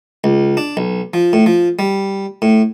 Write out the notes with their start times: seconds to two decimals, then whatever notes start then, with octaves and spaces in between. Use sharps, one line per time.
0.24 C#2
0.57 D4
0.77 B1
1.14 F3
1.33 A2
1.46 F3
1.79 G3
2.42 A2